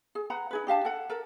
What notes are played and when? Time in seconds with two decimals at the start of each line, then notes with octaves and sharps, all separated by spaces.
0.15 G#4
0.30 B4 F#5 A#5
0.51 D#4 G#4 B4
0.67 D4 G4 F5 A5
0.85 A4 F#5
1.09 A4 A#4